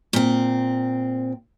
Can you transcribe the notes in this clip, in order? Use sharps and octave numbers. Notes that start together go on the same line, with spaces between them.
A#2 C4